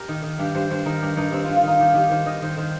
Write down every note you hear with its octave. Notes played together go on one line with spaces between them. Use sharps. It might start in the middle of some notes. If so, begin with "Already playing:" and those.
Already playing: G4 A#4
D#3
D#3
G2 G4
G2 C5
G2 C5
D#3 A#4
G2 G4
G2 D#4
G2 C4
G2 F4
F4
D#3 D#4
D#3 G4
D#3 G4
D#3 C5
D#3 D#5
D#3 C5
D#3 C5